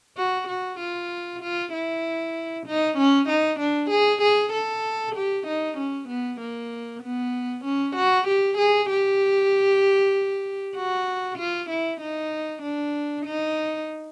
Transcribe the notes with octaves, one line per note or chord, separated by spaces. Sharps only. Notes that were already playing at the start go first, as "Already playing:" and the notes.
F#4
F#4
F4
F4
E4
D#4
C#4
D#4
D4
G#4
G#4
A4
G4
D#4
C#4
B3
A#3
B3
C#4
F#4
G4
G#4
G4
F#4
F4
E4
D#4
D4
D#4